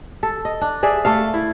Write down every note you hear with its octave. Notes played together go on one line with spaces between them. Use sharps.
A4
D#5
D4
G#4 D5 E5
A3 A4 F5
E4